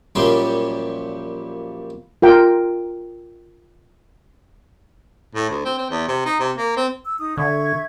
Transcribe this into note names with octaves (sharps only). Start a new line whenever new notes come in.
F#2 A#2 F3 G3 G5 C6
F4 A#4 G5
A2
D2
C4
C4
E2
C3
D#4
C3
A#3
C4
E6
D#4 D#6
D3 E5 C#6 G#6